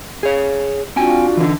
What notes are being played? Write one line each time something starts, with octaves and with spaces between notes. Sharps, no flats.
G#4 C#5
C4 D4 F4 F#4 G5 G#5
D3 E3